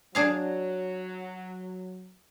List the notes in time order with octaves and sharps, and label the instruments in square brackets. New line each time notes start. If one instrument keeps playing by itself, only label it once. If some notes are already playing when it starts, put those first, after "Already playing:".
[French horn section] F#3 [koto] D4 G#4 F5